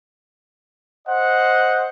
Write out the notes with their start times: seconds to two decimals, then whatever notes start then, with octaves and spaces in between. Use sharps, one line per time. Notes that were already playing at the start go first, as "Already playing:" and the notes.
1.08 C5 D#5 F#5